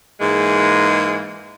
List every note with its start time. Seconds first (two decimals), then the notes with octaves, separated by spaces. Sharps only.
0.20 G#2 E3 G#3 A#3